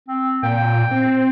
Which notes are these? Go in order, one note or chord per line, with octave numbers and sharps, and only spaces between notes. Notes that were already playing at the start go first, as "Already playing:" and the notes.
C4
A#2 G5
C4